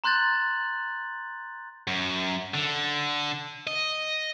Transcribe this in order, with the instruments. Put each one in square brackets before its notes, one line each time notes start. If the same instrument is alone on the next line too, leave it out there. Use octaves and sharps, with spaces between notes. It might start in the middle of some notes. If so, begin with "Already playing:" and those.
[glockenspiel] A#5 C6 F#6 G6 A6 F#7
[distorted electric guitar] F#2
D3
D#5